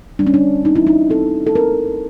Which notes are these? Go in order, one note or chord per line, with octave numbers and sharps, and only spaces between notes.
G3 D4
C#4
D4
C4 D#4
E4
D#4
C4 A4
A4
C4 A#4